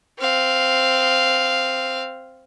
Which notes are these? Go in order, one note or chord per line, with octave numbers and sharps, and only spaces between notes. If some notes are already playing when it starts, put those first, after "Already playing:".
C4 F5